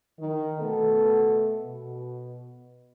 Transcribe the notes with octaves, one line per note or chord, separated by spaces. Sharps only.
D#3
B2 A3 B3 A4
B2